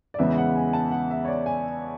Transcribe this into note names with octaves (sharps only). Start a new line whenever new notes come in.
D5
E2 C#3 E3 G#3 B3 E5
F#5
G#5
A5
F#5
E5
C#5
D5
G#5